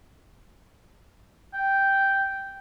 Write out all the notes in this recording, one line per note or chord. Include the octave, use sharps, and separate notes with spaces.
G5